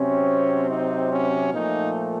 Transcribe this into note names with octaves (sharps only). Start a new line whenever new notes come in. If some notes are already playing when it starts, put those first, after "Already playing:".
Already playing: C3 F#3 C4 C#4
D#4
C#4
A#2 F3 A3 D#4